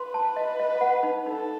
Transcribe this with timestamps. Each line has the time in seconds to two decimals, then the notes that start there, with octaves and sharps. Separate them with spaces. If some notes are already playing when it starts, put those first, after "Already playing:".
Already playing: B4 C6
0.14 A5
0.36 D#5
0.59 D#5
0.81 F#5
1.03 D#4
1.26 D#4 A4